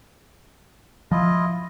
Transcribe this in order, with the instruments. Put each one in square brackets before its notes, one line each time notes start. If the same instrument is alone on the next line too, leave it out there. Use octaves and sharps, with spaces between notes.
[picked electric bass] F3 [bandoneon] E4 F4 D#5